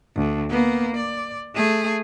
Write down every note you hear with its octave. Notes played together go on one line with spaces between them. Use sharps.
D2
A#3 B3
D5
A3 G#4